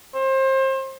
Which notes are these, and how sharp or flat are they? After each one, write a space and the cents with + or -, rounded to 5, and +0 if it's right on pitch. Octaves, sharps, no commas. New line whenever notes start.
C5 +30